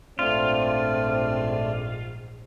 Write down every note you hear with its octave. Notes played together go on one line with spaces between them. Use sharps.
A#1 G#2 A3 C4 D4 F4 D5